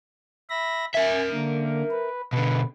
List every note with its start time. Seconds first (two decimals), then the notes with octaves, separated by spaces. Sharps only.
0.50 E5 B5 A#6
0.95 A#4 E5 G#5
1.31 D3 A#3
1.91 B4
2.33 B2 D3 B4